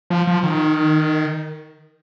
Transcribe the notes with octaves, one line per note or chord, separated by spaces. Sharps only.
F3
F3
D#3